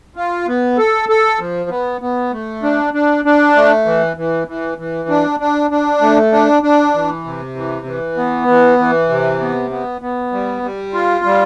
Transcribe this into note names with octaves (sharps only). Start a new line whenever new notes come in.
F4
B3
A4
A4
F3
B3
B3
A3
D4
D4
D4
A3
E3
E3
E3
E3
D4
D4
D4
A3
D4
D4
E3
C3
E3
E3
B3
E3
E3
C3
B3
B3
B3
G3
G3
F4
G3